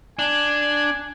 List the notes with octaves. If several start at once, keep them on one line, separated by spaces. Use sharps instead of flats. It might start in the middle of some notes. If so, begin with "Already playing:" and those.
D4 G#5